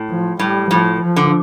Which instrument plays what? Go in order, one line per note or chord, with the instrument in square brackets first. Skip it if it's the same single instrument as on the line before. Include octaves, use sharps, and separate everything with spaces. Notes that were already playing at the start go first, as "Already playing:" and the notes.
Already playing: [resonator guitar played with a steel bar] A2
[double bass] F3
[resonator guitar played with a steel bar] A2 [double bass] G3
[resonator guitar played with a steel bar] A2 [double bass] F3
[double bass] F3
[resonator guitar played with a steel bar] D3